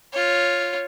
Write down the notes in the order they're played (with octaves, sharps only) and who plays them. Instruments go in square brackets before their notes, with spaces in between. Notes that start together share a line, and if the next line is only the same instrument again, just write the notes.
[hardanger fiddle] F4 C#5